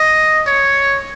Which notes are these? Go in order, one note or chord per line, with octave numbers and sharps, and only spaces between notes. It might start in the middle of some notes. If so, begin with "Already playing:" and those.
Already playing: D#5
C#5